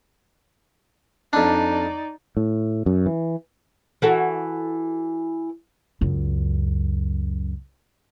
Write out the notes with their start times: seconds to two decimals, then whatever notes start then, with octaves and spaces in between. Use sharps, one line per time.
1.33 F2 D4 D#4 D5
2.37 A2
2.86 F#2
3.06 E3
4.02 E3 F#4 A4
6.01 C#2 F#2